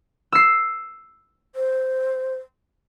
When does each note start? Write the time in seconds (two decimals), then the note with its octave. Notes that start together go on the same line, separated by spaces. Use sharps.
0.32 E6 C7
1.55 C5